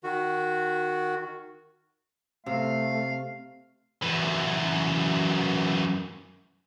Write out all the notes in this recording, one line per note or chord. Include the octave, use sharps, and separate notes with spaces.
D#3 F#4
C3 A3 F5
F#2 E3